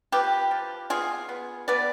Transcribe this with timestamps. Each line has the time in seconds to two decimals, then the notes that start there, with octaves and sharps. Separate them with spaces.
0.12 F3 G4 B4
0.51 F3
0.90 B3 F4 G#4
1.29 B3
1.68 B3 B4 D5